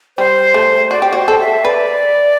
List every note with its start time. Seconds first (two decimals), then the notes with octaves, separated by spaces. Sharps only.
0.18 G3 C5
0.54 A3
0.91 F#4 D5
1.02 G4
1.13 F#4 C5
1.28 A4
1.40 E5
1.64 B4 D5